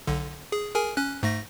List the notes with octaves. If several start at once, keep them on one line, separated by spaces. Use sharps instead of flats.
B1 D3
G#4
G#4 A#4 G#5
C#4 F#6
G#2 A3 A#6